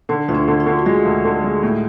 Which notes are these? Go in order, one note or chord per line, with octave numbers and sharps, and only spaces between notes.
D3 D4
D2 F4
D4
D3
F4
D3
F#4
G#3 F4
D2
D3
G#3
A2